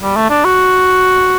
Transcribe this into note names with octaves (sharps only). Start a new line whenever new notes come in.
G3
A3
D4
F#4